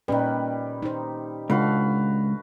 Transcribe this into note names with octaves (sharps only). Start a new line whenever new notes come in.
A#2 D#3 G3 C#4 B4
D#4 C5
C#2 D4 F#4 A4 B4 F5